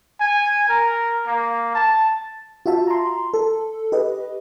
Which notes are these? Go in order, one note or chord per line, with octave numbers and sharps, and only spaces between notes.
G#5
A#4
A#3
A5
F4 F#4 E5 A5
A#5 C6
A4
G4 B4 D#5